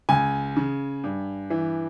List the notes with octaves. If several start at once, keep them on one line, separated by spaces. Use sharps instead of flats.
C#2 G#5
C#3
G2
E3